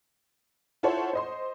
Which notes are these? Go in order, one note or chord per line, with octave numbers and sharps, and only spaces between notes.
E4 F4 A4 C5 C#5 F#5
C5 D#5 C6